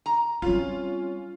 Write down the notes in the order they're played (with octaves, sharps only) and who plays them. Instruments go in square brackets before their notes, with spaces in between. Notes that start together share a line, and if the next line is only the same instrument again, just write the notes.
[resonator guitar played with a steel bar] A#5
[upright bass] G3 C4 [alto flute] C#4 [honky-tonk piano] F4